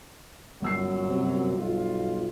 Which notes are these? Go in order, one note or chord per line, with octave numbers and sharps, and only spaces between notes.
G1 F#2 A#2 F#3 E6 C7
C3
B1 F4